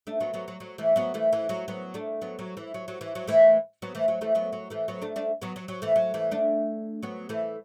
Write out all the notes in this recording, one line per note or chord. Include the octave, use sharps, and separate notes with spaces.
A3 D4
F#3 B3
F#3 B3
F#3
F#3
E3 A3
F#3 B3
E3 A3
E3
F#3
F#3 B3
A3 D4
F#3 B3
F#3
E3
F#3
F#3
E3
F#3
E3 A3
F#3 B3
E3 A3
F#3
E3 A3
F#3 B3
F#3
E3 A3
F#3 B3
A3 D4
A3 D4
F#3 B3
F#3
F#3
E3 A3
F#3
E3 A3
A3 D4
F#3 B3
E3 A3